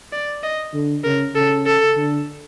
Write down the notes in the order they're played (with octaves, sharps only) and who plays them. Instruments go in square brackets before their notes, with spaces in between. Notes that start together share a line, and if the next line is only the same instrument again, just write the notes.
[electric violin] D5
D#5
[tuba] D3
[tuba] C#3 [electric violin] A#4
[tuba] C#3 [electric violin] A4
[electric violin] A4
[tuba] D3